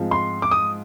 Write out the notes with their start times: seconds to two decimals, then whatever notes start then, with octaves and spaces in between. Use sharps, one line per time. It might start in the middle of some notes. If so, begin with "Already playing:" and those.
Already playing: G#2 F3 G#3 C4 F4
0.11 C6
0.42 D6
0.51 D#6